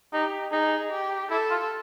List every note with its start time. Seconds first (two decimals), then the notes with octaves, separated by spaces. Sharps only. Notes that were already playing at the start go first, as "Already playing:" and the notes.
0.13 D#4 G4
0.52 D#4 G#4
0.92 G4
1.31 E4 A4
1.50 F4